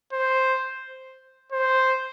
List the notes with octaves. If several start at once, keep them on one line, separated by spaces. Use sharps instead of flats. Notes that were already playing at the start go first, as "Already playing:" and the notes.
C5
C5